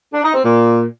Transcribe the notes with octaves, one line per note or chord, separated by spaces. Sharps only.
D4
D#4
C4
A#2